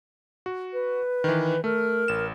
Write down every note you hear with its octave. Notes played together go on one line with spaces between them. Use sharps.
F#4
B4
D#3 E3
A3 A#4
A1 E7